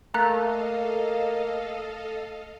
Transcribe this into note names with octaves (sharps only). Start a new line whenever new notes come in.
A3 A#3 A4 D#5 F5 A#5 F#6